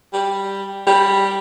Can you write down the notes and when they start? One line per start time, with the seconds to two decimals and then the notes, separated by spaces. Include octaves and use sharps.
0.13 G3
0.87 G3